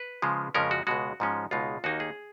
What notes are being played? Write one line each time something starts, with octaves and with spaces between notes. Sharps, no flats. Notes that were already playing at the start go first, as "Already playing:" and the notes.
Already playing: B4
C#3 F3 G#3
F2 C#3 F3 G#3 C#4 A#4
F#4
C#2 B2 G#3 F#4
G#2 F3 G#3 C#4
C#2 B2 G#3 D#4 F4
D#2 D#3 A#3 D#4 F#4
G#4